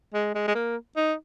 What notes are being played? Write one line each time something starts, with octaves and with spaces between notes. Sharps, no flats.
G#3
G#3
G#3
A#3
D#4